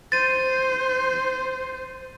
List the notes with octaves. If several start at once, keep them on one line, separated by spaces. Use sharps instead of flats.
C5 A6 D#7